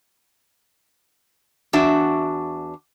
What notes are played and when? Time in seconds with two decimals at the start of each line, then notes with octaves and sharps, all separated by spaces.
1.73 E2 D4 F#4 E5